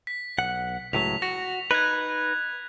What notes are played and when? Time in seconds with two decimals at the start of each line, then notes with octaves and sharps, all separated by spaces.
0.07 B6
0.38 B1 F#5
0.93 C#2 A2 F#3 B6 F7
1.22 F#4 A#6
1.71 D#4 B4 F#6 G#6